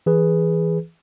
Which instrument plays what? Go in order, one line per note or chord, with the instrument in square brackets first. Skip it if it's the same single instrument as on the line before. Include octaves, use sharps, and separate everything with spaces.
[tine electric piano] E3 G#4 B4